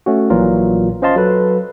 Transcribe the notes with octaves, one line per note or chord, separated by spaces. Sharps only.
A3 C#4 F#4
A#1 A#2 E3 F#3 F4 A#4
C#4 C5 D#5 F5 A5 C6
F#3 A4 B4